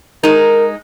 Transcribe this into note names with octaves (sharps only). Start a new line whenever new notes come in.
G#3 D#4 A#4